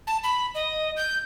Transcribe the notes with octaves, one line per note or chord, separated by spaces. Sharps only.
A5
B5
D#5
G6